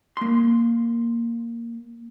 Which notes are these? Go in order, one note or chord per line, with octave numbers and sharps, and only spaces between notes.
A#3 C6